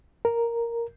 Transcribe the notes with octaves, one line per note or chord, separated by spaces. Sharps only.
A#4